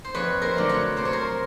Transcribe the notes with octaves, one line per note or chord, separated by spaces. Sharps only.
C5
F2 B4 C#5
A#4 C5
D3 F#3 A3
B4 C#5
C3 C5
C#5
A#4 C5